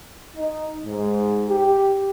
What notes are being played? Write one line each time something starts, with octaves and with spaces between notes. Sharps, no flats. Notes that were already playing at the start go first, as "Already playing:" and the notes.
D#4
G#2
G4